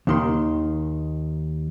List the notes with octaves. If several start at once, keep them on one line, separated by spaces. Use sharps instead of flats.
D#2 D#3 C6